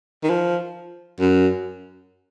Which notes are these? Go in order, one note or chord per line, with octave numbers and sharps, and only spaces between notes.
D#3
F3
F#2